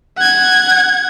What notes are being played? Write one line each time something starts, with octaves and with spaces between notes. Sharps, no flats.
F#5 G#6